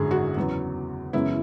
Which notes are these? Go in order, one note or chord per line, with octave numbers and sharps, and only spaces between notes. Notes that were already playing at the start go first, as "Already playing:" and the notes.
Already playing: G#1 F#2 D3 G#4
F#4
E2 C#3 F#3 B3
F#2 C#3 E3 G#3 B3 E4